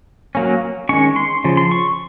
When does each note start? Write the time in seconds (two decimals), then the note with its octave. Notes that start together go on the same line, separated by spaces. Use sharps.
0.35 F#3 A#3 C#4
0.89 D#3 G#3 C#4 C#6
1.16 C6
1.44 C#3 F3
1.57 C6
1.71 C#6